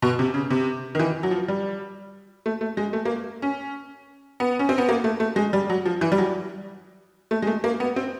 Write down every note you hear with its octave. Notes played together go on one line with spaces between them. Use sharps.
B2
C3
C#3
C3
D#3
E3
F#3
F3
G3
A3
A3
G#3
A3
A#3
C#4
B3
C#4
C4
B3
A#3
A3
A3
G#3
G3
F#3
F3
E3
G3
F#3
A3
G#3
A3
A#3
B3
C4